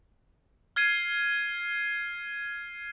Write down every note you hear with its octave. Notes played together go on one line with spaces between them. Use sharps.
F6 G#6 C7 D#7